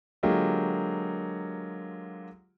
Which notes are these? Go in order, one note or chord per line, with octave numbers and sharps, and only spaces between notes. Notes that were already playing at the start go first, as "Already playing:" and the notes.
D3 F#3 G#3 A#3 F4 G4